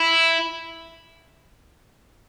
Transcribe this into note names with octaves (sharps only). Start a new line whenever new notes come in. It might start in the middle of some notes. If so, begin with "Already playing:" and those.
Already playing: E4